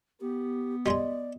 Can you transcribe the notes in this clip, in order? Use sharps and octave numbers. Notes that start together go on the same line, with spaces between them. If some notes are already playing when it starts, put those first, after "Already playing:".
B3 G4
G3 G#3 G#4 D5 D#5 C6